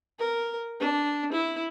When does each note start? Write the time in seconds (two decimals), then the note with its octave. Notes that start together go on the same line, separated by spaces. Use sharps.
0.19 A#4
0.80 D4
1.32 E4